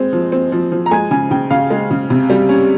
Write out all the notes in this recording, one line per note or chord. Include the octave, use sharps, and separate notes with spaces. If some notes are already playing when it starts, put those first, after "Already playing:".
Already playing: G#3 C4
F3
C4
F3
F3
A#5
G#3 G#5
C#3 G#5
C#3 G5
C#3 F5
G#3
C#3
C3
G3
C#4